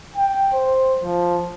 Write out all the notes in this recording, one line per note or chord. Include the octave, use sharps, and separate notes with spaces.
G5
C5
F3